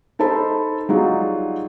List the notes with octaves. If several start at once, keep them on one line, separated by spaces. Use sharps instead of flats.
D#4 A4 C5 A5 B5
F#3 G3 D#4 F4 F#4 G#4